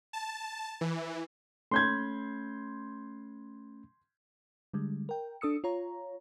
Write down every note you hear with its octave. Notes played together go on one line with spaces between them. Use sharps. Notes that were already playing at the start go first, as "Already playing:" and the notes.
A5
E3
A3 C#4 B5 C6 G6 G#6
D3 G3 G#3
A#4 G5
D4 A4 D#6 E6 C#7
F4 C#5 A#5